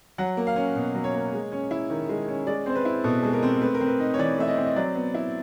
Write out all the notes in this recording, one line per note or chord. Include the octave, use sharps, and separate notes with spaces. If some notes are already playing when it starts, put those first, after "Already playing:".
F#3 F#5
A#3
F5
C#4
B2
F#3
C#5
A#3
G#3
C#4
E4
D#3
G#3
C#4
G#3 D5
C4 C5
B4
E4
B2 A4
G#3 A4
A#4
C4
A3 B4
A#4
C4
B4
D#4
C#5
E3 D5
A3 E5
D#5
C4
D#5
F#3 D5
B3
E4